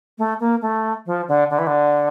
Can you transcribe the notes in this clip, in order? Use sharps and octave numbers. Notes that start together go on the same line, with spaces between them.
A3
A#3
A3
F3
D3
D3
E3
D3